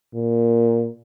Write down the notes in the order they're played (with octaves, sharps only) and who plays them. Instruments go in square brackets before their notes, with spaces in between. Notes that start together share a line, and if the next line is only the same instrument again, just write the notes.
[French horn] A#2